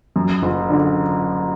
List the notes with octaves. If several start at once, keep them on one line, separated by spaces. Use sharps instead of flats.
F#2
F#1
D3